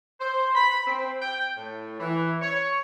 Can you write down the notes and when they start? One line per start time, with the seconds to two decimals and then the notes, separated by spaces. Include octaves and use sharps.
0.20 C5
0.55 B5
0.87 C4
1.22 G5
1.57 A2
2.00 E3
2.42 C#5